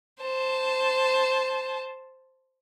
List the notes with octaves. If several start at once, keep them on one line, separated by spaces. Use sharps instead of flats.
C5 A5